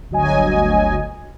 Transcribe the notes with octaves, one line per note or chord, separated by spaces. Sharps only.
G1 D2 F#3 D#5 G#5